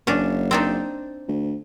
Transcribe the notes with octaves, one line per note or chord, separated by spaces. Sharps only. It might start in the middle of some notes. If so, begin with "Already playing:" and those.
F#1 C#4 D4
C4 D4 D#4
D2